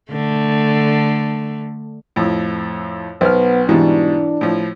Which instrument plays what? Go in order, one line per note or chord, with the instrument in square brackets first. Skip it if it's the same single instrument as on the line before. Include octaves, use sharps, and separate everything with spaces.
[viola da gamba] D3 A3
[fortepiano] F2 A2
[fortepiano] B1 F6 [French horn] B3 [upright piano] C5
[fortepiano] G#2 B2 G3 [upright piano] E3 [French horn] D4
[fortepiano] A2 F3